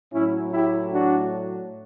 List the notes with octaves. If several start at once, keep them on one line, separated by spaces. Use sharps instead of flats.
A2 F#3 A3 C#4 E4
E4 G4
D4 F#4